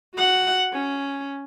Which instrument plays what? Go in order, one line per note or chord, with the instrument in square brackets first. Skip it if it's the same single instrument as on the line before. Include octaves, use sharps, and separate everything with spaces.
[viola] F#4 F#5
C#4